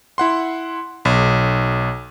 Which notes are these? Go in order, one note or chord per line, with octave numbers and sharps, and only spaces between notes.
E4 F#5 C6
B1